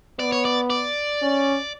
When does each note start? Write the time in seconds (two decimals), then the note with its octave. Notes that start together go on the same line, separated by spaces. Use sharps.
0.19 B3 D5
0.32 C#5
0.45 D5
0.70 D5
1.22 C#4